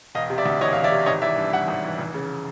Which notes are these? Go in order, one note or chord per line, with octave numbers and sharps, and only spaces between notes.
E1 D#5 F5
C3
D5 E5
D2
E3 C#5 D#5
E1 F5
D5 E5
C3
G#1 C#5 D#5
E3 D5 E5
G2
G3 E5 F#5
G#1
E3
F1
C#3